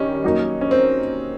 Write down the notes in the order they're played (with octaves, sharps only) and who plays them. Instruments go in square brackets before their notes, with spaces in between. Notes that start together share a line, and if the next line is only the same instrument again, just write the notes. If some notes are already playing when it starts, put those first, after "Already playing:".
Already playing: [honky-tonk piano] D#3 G3 [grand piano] C#4
[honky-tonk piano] F#3 A#3 D#4
[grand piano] C#4
C4